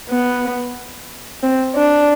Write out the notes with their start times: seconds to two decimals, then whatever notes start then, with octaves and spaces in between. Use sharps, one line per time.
0.09 B3
1.43 C4
1.76 D4